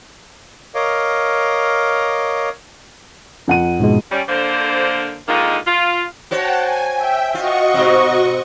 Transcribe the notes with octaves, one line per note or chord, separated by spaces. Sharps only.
A#4 C#5 D#5 F5 D6
F2 F#5 D#7
G#2 B2 G#3
G3 C#4
D3 A#3 C5
D3 D#3 G#3 A#3 D#4 F4
F4
F#4 C5 C#5 F#5 G5 A5
G#5
E5 G5
F4 F#4 D#5 C#6
G#2 B2 C4